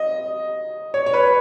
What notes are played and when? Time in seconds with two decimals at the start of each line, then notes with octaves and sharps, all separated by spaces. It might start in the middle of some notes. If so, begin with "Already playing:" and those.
Already playing: D#5
0.94 C#5
1.06 C#5
1.14 B4